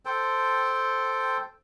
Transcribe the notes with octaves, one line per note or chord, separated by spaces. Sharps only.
A4 C5 G5